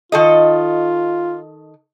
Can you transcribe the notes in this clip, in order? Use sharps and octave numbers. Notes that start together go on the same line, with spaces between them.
D#3 F4 A4 D#5